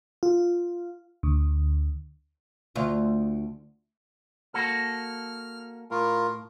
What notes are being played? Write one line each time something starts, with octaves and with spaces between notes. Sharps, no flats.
F4
D2
D2 F4
A#3 F#4 A4 F6
A2 F4 A#4